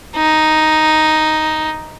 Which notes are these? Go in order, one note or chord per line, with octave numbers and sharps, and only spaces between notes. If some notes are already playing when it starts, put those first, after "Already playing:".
D#4